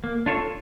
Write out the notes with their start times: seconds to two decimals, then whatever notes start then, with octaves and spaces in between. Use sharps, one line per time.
0.04 A#3
0.26 D4 F4 A4 C#5